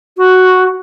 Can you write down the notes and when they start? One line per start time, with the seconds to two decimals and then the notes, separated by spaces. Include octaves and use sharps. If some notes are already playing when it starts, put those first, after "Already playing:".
0.17 F#4